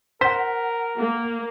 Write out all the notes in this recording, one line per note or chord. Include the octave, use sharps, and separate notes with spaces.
A#4 C5 F#5 B6
A#3